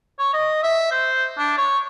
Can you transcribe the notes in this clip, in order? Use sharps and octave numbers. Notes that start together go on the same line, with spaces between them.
C#5
D#5
E5
C5
D4
C#5